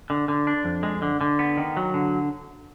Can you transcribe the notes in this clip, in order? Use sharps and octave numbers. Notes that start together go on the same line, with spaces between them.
D3
D3
D4
F2
G#3
D3
D3
B3
D#3
F#3
D3